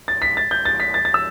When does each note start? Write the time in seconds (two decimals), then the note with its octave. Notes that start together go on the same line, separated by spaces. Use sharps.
0.08 A6
0.22 B6
0.37 A6
0.51 G6
0.65 A6
0.80 B6
0.94 A6
1.05 A6
1.14 E6